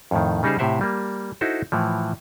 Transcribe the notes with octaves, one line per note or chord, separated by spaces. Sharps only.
F2 A2 D#3
C#3 G3 D#4 G4 G#4 C5
A2 C3 G4 C5 E5 F#5
G3 A#3
D#4 E4 F#4 A4 C5
A2 E3 F3